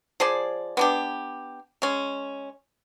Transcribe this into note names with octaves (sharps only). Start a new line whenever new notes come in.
F3 G#4 C5 D5
B3 D4 G4
G#3 C#4